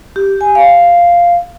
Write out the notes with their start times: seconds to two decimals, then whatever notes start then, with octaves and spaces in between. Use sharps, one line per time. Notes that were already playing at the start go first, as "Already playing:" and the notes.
0.16 G4
0.41 G#5
0.55 F5